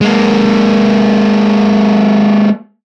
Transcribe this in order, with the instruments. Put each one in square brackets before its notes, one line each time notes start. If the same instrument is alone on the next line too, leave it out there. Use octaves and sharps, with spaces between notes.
[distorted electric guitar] G#3 A#3